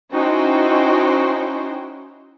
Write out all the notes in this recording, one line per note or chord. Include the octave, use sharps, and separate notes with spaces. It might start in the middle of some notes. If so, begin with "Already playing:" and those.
C#4 D#4 E4 F#4 C5 G5